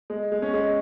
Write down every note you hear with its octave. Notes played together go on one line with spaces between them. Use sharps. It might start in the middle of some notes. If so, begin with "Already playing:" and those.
G#3
G#3
C#4
G#3